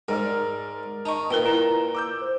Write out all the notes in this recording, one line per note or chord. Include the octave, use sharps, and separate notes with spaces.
G#2 A#4 D5 F6
D#4 A5 C#6
A#2 A#4 B4 G5 G7
E4 F4 A#5 E7
D6 E6 G6
C5